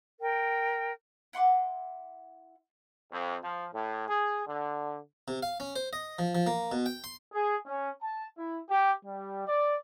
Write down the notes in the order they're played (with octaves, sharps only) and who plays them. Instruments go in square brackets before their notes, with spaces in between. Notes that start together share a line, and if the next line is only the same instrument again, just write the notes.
[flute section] A#4 G5
[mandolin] E4 F#5 C6 D6
[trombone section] F2
F3
A2
G#4
D3
[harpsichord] C3
F5
C#4
C5
D#5
F3
F3
A#3
B2
G5
C6
[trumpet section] G#4
C#4
A5
E4
G4
G3
D5